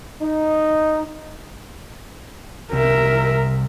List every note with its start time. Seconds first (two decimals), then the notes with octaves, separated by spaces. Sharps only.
0.22 D#4
2.72 C2 A#4 E5